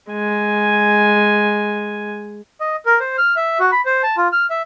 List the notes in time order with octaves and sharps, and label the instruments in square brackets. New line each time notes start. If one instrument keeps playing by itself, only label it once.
[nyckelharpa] G#3 G#5
[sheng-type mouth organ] D#5
A#4
C5
F6
E5
F#4
B5
C5
A5
F4
F6
E5